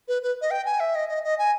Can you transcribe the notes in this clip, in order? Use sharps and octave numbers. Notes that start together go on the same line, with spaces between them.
B4
B4
D#5
G5
G#5
E5
D#5
D#5
D#5
G#5